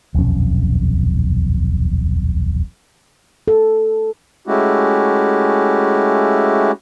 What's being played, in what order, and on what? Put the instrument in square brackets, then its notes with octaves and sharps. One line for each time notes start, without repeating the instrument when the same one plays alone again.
[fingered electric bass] D#1 B1 F2 C#4
[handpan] A4
[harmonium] G#3 A3 C#4 E4 F#4 G4